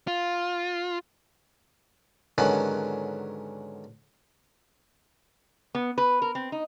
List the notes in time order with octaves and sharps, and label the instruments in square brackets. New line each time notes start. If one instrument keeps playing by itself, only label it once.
[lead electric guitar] F4
[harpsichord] G#2 D3 D#3 F#3 B3 C#4
[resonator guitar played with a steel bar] B3
B4
A#4
C4
D#4